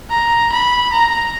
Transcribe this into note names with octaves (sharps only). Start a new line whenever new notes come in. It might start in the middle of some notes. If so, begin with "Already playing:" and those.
A#5
B5
A#5